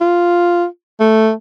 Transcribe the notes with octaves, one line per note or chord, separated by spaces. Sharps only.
F4
A3